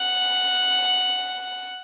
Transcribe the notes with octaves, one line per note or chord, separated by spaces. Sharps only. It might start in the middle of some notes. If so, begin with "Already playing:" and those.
Already playing: F#5